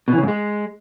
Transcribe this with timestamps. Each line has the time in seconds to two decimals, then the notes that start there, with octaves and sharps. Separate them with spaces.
0.08 B2
0.13 E3
0.18 C#3
0.23 G#2
0.28 G#3